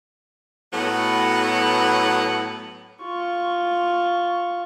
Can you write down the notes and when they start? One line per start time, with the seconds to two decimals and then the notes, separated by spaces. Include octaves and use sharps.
0.73 A2 F#3 B3
3.03 F4 C#6